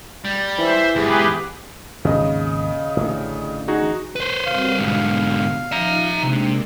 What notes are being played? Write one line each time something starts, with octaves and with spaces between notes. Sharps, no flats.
G3
E3 C5 E5
E2 G#2 G4 G#4 B4
G#1 D#2 C#3 D#5
A1 D3
D#4 F#4 G#4
B4 C5 C6
G3 C4 F#4 F5
G#2 B2 D3
F3 D#4 E5 A#5
C3 G#3 A#3 D4